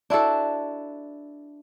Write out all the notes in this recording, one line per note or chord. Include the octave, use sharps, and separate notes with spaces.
D4 E4 F#4 A4